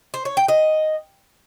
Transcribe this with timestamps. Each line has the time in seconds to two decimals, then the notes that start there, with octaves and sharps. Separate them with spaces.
0.14 C5
0.25 C#5
0.37 G5
0.48 D#5